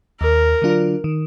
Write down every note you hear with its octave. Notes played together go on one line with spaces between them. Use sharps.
D#2 A#4
D3 F#3 D4 F4
D#3